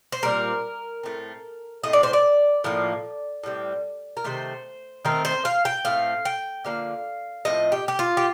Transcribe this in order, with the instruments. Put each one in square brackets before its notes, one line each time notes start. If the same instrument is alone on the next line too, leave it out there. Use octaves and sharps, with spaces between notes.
[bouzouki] C5
A#2 G3 C4 A#4
A2 A3 C4
A2 A3 C4 D#5
D5
C5
D5
A2 F3 A#3
A2 G3 C4
A#4
C3 D#3 A3 C5
D#3 A3 C4 A#4
C5
F5
G5
A2 A3 C4 F5
G5
D3 F3 A#3 F5
A2 F3 A3 C4 D#5
G4
G4
F4
G4